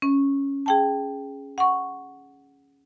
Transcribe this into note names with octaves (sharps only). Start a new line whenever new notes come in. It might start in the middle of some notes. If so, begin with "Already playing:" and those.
C#4
G#4 G5 A5
F#5 C#6